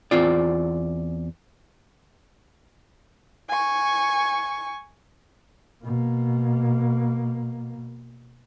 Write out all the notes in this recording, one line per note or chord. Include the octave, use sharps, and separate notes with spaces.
E2 C4 F4 D5
G#5 C#6
B2 A#3